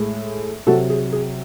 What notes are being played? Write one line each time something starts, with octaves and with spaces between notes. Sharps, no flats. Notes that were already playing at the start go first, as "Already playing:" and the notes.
Already playing: A2 G#3
C3 F#3 F#4 A4
G#4
G#4